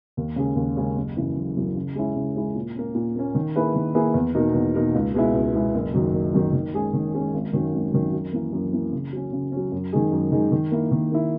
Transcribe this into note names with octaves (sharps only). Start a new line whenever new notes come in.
D#2
C#3 G#3 C#4 G#4
D#2
C#3 G#3 C#4 G#4
F#1
F#2 C#3 E3
F#1
F#2 C#3 E3
C#3
G#3 C#4 E4
C#3
G#3 C#4 E4
A#2
A#3 C#4
A#2
A#3 C#4
D#3
A#3 E4 G#4 B4
D#3
A#3 E4 G#4 B4
E2
B2 A#3 D#4 A#4
E2
B2 A#3 D#4 A#4
C#2
B2 G#3 B3 E4
C#2
B2 G#3 B3 E4
F#1
F#2 D#3 F#3
F#1
F#2 D#3 F#3
D#3
G#3 C#4 G#4
D#3
G#3 C#4 G#4
G#1
F#2 D#3 F#3 C#4
G#1
F#2 D#3 F#3 C#4
F#2
E3 A#3
F#2
E3 A#3
C#3
F#3 C#4
C#3
F#3 C#4
F#2
D#3 G#3 D#4 G#4
F#2
D#3 G#3 D#4 G#4
D#3
A#3 E4
D#3
A#3 E4